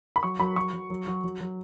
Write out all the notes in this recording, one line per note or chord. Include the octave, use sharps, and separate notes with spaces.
B5
F#3 C#6
F#3 B5
F#3 C#6
F#3
F#3
F#3
F#3
F#3